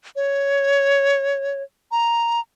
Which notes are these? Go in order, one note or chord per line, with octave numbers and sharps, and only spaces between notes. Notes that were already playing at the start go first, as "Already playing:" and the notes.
C#5
A#5